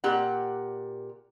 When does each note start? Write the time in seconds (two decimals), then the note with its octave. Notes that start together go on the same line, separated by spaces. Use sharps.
0.04 A#2 G4 F#5